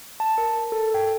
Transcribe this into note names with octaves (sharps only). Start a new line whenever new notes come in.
A5
A#4
A4
G5